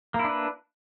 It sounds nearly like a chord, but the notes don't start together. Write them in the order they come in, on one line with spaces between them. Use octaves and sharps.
A#3 E4 D4 B4